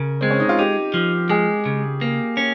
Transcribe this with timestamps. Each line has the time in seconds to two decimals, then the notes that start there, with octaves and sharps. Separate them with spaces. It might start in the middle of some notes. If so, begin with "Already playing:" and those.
Already playing: C#3 A#4
0.21 G#3 C4
0.30 C#4
0.40 D#4
0.49 F4
0.58 D#4 G4
0.94 F3
1.29 G#3 G#4
1.65 C#3
2.01 A#3
2.37 C#4